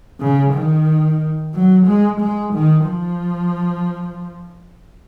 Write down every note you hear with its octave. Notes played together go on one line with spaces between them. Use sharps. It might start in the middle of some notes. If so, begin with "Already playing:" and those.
C#3
D#3
F#3
G#3
G#3
D#3
F3